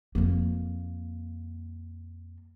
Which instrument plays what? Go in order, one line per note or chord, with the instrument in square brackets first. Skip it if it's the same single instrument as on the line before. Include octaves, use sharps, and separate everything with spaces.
[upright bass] F2 A#3